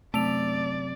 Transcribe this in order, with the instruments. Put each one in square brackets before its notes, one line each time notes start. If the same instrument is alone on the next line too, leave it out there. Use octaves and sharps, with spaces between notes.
[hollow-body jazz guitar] F#2 C3 [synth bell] A3 D7 F7 [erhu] D5